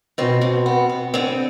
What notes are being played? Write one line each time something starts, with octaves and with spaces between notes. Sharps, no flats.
B2 C4
B2
B3
B3
D3 C4